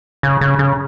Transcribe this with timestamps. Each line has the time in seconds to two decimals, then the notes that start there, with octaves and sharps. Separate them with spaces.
0.23 C#3
0.41 C#3
0.59 C#3